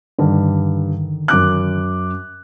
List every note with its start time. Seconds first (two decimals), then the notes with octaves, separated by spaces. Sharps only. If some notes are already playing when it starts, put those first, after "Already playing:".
0.19 G2 D3 D#3
1.28 F#2 D6 F#6